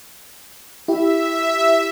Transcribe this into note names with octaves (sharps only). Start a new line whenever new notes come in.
E4 G4 E5